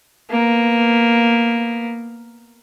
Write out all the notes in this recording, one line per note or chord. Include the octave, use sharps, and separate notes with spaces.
A#3 B3